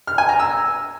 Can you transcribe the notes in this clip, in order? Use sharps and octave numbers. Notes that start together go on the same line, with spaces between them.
F6
G#5
A#5
E6